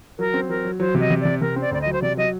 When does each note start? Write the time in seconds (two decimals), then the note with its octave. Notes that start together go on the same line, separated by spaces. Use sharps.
0.19 F#3 A#4
0.34 C4
0.49 F#3 A#4
0.65 F#3
0.80 F#3 C5
0.95 C3
1.00 D#5
1.10 C3
1.21 C3 D5
1.41 C3 A#4
1.56 C4 D5
1.71 D2 D5
1.82 F#3 D#5
1.93 C5
2.02 C3 D5
2.17 F#3 D#5